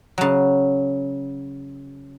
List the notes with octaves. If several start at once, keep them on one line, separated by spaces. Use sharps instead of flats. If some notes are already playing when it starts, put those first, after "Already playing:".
C#3 F#3